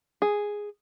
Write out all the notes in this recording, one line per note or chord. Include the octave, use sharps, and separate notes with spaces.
G#4